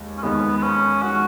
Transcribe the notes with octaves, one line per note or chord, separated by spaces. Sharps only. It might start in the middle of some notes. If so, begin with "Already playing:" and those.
Already playing: D#2 G#3
C#4
D#2 D#3 G#3 B3
B3
C#4
D#3 G#3 F#4